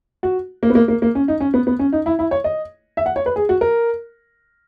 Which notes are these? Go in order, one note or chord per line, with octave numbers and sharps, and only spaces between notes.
F#4
A#3
B3
A#3
A#3
A#3
C#4
D#4
C#4
B3
B3
C#4
D#4
E4
E4
C#5
D#5
E5
F#5
C#5
B4
G#4
F#4
A#4